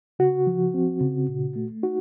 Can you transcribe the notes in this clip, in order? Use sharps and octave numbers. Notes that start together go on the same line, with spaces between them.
C#3 F#4
F3
C4
C#3
A#2
A3
D#4 F#4